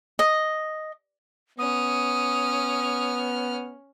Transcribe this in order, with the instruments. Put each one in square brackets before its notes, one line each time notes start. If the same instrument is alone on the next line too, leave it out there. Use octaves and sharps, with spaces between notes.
[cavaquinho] D#5
[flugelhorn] B3 [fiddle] C#4 F6 [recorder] D#6